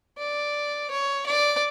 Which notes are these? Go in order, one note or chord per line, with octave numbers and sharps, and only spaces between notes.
D5
C#5
D5